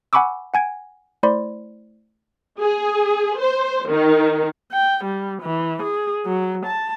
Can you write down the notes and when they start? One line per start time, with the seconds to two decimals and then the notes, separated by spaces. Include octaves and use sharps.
0.13 F#5 G#5 B5 C#6 D6 E6
0.54 F#5 G#5 G#6 D7
1.23 A3 E4 C5 D5 B5 C6
2.60 G#4
3.38 C5
3.88 D#3
4.72 G5
5.05 G3
5.43 E3
5.83 G#4
6.26 F#3
6.66 A5